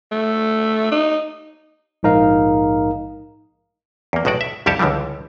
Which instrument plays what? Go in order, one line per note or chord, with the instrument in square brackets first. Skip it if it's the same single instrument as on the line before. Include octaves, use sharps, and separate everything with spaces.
[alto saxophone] A3
D#4
[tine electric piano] A#1 G#2 D#4 A#4 F5
[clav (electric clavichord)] E2 A#3
B1 A2 G#3 F#4 D5
E5
C2 F2 G3 G4 C#5 A5
C#2 D3 E3 F3 G3